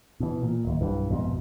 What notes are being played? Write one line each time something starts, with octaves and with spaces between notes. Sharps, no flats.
B2 E3
A#2
D1 D#2
B1 G2 E3
A#1 F2 G#2 B2